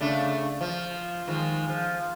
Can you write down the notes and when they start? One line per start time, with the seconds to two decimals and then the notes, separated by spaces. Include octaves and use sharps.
0.01 C#3 A3 D4
0.61 F3
1.27 D#3 F3 G#3
1.70 F3